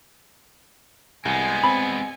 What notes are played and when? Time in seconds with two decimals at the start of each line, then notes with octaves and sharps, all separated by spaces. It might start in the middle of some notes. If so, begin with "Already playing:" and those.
1.25 C2 G#3 B3 G#5
1.64 C4 B5